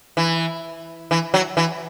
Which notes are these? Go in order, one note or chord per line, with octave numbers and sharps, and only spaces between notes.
E3
E3
F#3
E3